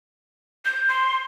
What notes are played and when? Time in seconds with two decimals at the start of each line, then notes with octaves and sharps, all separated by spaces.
0.65 G6
0.88 C6